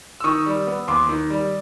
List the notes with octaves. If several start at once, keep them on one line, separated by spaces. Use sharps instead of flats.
E6
D#3 C#6 D#6
G3
B3
D#2 C6 D6
D#3
G3